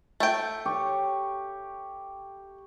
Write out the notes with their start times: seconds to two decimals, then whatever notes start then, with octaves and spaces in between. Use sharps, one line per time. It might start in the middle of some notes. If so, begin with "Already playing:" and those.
0.20 A3 G5
0.66 G4 C#5